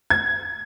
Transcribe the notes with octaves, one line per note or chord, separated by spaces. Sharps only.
G#6